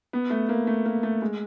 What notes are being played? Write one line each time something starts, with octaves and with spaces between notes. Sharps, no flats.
B3
A3
A#3
A3
A#3
A3
G#3